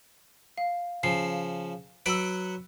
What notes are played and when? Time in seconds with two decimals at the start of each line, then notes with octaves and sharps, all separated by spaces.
0.58 F5
1.03 C#3 F3 C7
2.06 F#3 B4 F#5 E6 D7